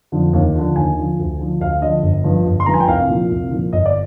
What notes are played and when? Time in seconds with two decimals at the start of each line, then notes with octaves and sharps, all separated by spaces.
0.12 F2 D3 F3
0.33 D#2
0.55 D3 F3
0.76 D#2 G#5
0.97 D3 F3
1.19 D2
1.39 D3 F3
1.60 D2 F5
1.81 D3 F3 D#5
2.03 G1
2.24 G2 F3
2.46 G1
2.60 C6
2.66 G2 F3 A#5
2.74 G#5
2.80 G5
2.88 C2 F5
3.09 A#2 F3
3.31 C2
3.51 A#2 F3
3.73 G1 D#5
3.85 D5